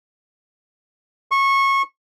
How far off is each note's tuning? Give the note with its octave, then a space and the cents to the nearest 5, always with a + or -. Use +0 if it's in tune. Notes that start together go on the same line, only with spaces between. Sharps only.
C#6 -20